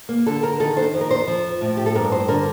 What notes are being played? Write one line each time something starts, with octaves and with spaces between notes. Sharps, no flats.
A#3
D3 A4
A#4
D#3 A4
C5
F2
A#4
C5
F3
A2
G4
A4
G2 A#4
C5
D3 A#4